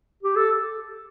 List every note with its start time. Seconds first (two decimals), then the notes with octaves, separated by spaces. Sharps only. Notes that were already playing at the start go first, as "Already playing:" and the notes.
0.23 G4
0.36 A4